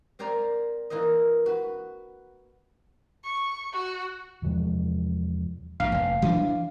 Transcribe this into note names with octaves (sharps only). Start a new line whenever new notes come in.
C4 A#4 C5 D5 G#5 A#5
E3 A#3 A#4 C5 D#5
F#4 B4
C#6
F#4
E2 C3 F3 G#3
A#1 G#2 F5
F1
E3 D4